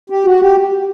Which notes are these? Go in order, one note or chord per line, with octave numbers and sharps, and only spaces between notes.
G4
F#4
G4